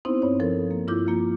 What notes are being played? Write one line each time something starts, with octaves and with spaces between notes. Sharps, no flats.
B3 C4 D#4 E4 C5
G2 C#5
F3 A4 A#4
A#3
G2 E4 F4 D6 G6
F3 A#3 F4